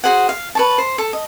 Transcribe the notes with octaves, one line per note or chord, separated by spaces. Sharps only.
F#4 G#4 C5 F#5
F5
B4 C#5 A5
C5
A4
D#5